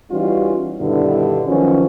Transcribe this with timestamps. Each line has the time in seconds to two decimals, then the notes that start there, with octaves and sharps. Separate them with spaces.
0.10 E3 G3 C#4 D#4 F4 F#4
0.80 G2 B2 D3 D#3 B3 E4
1.47 D#3 F3 F#3 B3 C#4